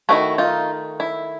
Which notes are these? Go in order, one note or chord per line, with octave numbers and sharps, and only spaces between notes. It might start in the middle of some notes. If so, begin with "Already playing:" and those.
D#3 F#3 A3 E4 F#4
D#4 F4
E4